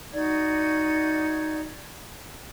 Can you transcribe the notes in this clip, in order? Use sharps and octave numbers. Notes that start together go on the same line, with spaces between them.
D#4 F#4 D5 G#6